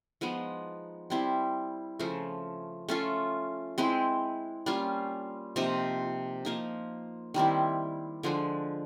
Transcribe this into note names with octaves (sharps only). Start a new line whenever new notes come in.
F3 G#3 B3 D#4
G3 C4 E4
C#3 F3 A3
A3 C#4 F4
G#3 C4 E4
G3 A#3 C#4 F4
C3 F3 A#3 D#4
F3 A#3 D#4
D#3 G3 C4 E4
D3 F3 G#3